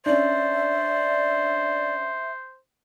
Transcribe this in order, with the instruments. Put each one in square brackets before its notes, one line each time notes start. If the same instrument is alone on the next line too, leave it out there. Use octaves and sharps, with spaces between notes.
[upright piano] C#4 D4 [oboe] C5 [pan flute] D5 [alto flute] E5